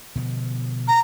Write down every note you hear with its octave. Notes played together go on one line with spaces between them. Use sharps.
B2 D3 F3
A#5